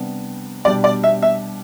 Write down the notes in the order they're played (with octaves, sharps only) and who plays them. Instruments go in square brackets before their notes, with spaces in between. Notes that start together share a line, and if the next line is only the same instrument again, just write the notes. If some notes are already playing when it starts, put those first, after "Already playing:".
Already playing: [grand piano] C3 G3 B3 D4
[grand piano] B2 G3 D4 G4 [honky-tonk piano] D5
[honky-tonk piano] D5
E5
E5